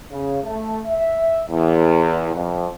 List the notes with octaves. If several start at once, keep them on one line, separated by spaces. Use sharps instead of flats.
C#3
A3
E5
E2
F2